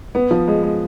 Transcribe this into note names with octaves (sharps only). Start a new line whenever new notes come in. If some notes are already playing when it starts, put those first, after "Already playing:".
B3
F3
G#3
G#3